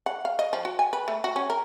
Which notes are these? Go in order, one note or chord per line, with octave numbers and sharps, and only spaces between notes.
F#5
F5
D#5
F3
F#4
G#5
B4
A3
F#4
C#4
A#4